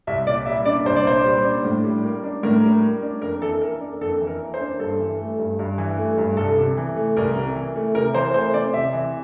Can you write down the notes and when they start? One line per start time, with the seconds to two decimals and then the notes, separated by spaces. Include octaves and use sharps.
0.07 C2 E5
0.26 A#2 D5
0.46 G3 E5
0.65 D4 D5
0.85 C2 C5
0.96 D5
1.05 A#2 C5
1.26 G3
1.45 D4
1.65 A2
1.84 G3
2.04 A#3
2.23 D4
2.43 A2 A#4
2.63 G3
2.82 A#3
3.03 D4
3.22 F2 A#4
3.41 E3 A4
3.61 A#3 A#4
3.81 D4
4.01 F2 A4
4.20 E3
4.27 A#4
4.41 A#3
4.54 C5
4.61 D4
4.80 G2 A4
4.99 E3
5.19 A3
5.39 G2
5.59 G2
5.78 E3
5.98 A3
6.18 G2
6.37 C2 A4
6.57 C3
6.77 E3
6.96 A3
7.17 C2 A#4
7.36 C3
7.56 E3
7.75 A3
7.95 C3 A#4
8.15 E3 C5
8.34 A3 C5
8.54 C4 D5
8.74 C3 E5
8.93 E3